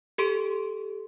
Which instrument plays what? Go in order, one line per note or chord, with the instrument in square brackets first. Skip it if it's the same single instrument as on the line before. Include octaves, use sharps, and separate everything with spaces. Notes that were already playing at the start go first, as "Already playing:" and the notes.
[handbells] G4 A4 C6 D7